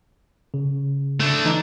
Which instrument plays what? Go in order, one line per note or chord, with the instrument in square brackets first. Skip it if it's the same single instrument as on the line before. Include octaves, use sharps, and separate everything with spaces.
[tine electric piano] C#3
[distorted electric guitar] A3 D4
[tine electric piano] E3 D#4